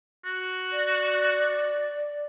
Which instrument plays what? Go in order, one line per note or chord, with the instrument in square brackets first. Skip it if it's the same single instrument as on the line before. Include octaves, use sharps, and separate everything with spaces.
[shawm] F#4
[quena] D5